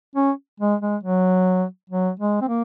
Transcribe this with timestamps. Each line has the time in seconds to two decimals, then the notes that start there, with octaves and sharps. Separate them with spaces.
0.16 C#4
0.60 G#3
0.81 G#3
1.03 F#3
1.90 F#3
2.20 G#3
2.41 C4
2.48 A#3